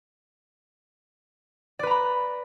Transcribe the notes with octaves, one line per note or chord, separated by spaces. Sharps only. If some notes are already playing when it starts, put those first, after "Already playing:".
B4 D5 A#5 B5